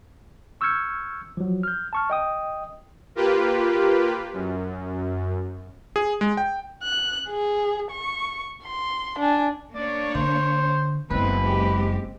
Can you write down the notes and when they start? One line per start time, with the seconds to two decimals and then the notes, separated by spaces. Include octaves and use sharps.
0.61 C#6 E6 F6 G6 G#6 C#7
1.37 F3 F#3
1.63 F6 G6
1.93 A5 C#6 F6
2.10 D#5 G5 D#6
3.15 A#3 F4 G4 B4
4.34 F#2
5.96 G#4
6.21 G#3
6.37 G5
6.83 F#6
7.30 G#4
7.91 C#6
8.64 C6
9.19 D4 G#5
9.75 A#3 D4 C#5 D5
10.15 D3 C5
11.10 F#1 G#3 B3 C4 B4
11.42 G#3 C4 G4